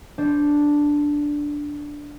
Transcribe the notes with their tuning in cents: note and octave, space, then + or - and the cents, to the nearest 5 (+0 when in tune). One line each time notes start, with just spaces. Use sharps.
D4 +0 C5 +0